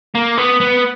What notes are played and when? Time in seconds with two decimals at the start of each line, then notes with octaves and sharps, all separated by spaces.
0.15 A#3
0.38 B3
0.60 B3